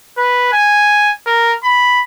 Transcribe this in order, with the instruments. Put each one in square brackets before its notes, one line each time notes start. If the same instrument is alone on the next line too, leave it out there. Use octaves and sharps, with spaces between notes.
[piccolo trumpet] B4
G#5
A#4
B5